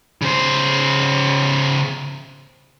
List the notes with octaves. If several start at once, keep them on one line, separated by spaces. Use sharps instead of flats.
C#3 C5